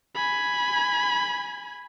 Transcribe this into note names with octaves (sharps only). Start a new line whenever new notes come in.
G#5 B5